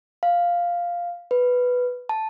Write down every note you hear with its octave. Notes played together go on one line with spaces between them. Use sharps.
F5
B4
A5